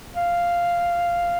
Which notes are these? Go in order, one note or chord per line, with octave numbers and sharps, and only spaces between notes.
F5